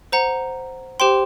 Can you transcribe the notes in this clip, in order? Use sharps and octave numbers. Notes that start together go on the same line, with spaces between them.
C5 F#5 A#5
G4 C5 G5 C6